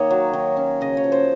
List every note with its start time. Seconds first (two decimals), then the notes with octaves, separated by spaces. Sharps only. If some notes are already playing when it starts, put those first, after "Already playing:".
Already playing: D#3 A#3 C#5 D#5
0.10 F#3
0.33 D#3
0.57 C#4
0.81 C#3 D#5
0.97 C#5
1.04 F3
1.12 C5